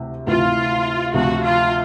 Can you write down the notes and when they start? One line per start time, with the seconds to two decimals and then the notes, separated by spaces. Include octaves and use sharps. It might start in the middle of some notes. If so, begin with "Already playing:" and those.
Already playing: D2 C3 E3
0.27 D2 C3 E3 F4
1.14 D2 C3 F3 F#4
1.44 F4